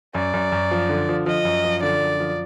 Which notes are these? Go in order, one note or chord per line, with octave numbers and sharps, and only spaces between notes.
F#2 D5
F#2
F#2
F3
D3
F3
F3 D#5
F#2
F3
D3 D5
F#2
F3